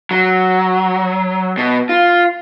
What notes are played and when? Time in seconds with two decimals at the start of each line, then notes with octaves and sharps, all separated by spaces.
0.11 F#3
1.58 B2
1.89 F4